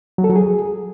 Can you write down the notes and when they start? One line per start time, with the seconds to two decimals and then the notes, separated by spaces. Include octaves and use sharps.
0.18 F#3
0.24 A4
0.30 F#3
0.36 G#4